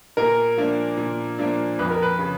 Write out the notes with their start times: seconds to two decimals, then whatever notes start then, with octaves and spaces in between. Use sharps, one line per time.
0.17 A#2 A#4
0.57 F3 A#3 D4
0.97 A#2
1.38 F3 A#3 D4
1.79 F2 B4
1.91 A#4
2.02 B4
2.19 C#3